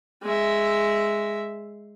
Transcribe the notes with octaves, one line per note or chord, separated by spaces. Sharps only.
G#3 E5